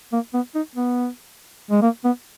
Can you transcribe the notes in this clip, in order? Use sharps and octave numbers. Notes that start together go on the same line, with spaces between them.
A#3
B3
D#4
B3
G#3
A#3
B3